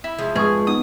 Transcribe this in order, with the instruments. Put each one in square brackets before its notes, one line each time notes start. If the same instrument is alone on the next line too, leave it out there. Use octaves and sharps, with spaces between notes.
[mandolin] E4
[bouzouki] F3 G#3
[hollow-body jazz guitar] F2 G#2 [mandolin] G#4 [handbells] B4 C#6 D#6
[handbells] B3 D#4 [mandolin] D#6